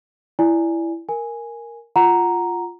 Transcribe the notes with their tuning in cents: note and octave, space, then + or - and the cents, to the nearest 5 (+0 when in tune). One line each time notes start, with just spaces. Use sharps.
E4 +10 D5 +0 G#5 +0
A#4 +0 G#5 +0
F4 +0 F#5 +0 A#5 +0